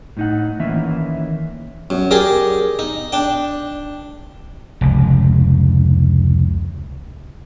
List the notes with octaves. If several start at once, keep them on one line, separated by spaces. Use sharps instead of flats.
A2 D#4 F#5
D#3 E3 A#3 C#4 E5
F#2
G4 G#4 A#4 D5
D#4
D4 G5
F1 C#2